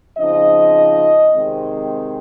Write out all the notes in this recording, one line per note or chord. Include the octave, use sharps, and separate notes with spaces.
C#3 F3 C4 D#4 D#5
C3 D#3 G#3 C4